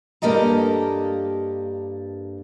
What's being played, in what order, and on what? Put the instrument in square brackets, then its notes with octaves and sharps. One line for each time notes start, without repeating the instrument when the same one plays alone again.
[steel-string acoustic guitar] G2 A#3 G4 A4 D#5 A#5